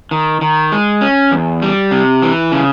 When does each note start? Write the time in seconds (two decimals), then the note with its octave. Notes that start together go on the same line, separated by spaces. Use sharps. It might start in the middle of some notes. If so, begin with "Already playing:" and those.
0.11 D#3
0.41 D#3
0.72 G#3
1.01 C#4
1.32 E2
1.62 G3
1.91 C3
2.22 E3
2.52 C#3